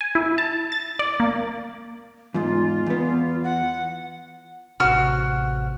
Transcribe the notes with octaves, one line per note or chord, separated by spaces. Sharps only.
G#5
E4
A5
A6
D5
A#3
E2 G#2 F4
E2 B3
F#5
A1 C3 F#4 F6